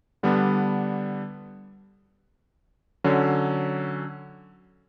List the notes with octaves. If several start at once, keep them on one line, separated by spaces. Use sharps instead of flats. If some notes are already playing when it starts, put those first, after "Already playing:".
D3 G3 B3 D4
D3 F#3 C#4